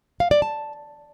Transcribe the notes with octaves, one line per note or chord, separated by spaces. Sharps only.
F5
D5
A5